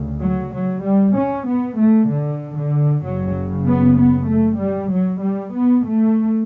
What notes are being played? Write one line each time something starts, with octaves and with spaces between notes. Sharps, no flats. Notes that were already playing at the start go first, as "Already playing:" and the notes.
Already playing: D2 C#3
F#3
F#3
G3
C#4
B3
A3
D3
D3
F#1 F#2 C#3 F#3
B3
B3
A3
G3
F#3
G3
B3
A3